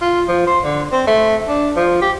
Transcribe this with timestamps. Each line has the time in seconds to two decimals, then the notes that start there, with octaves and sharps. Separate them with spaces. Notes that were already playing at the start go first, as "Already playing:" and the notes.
0.02 F4
0.28 F3
0.47 C5
0.64 D3
0.92 C4
1.07 A3
1.48 D4
1.76 F3
2.01 G4